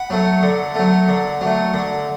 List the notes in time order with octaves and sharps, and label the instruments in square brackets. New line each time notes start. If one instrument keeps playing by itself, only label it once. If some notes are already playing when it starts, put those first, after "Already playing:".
Already playing: [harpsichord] F#5 B5
F#3 A3
D3
F#3 A3
D3
F#3 A3
D3